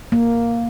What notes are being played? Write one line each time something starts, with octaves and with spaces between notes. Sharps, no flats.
A#3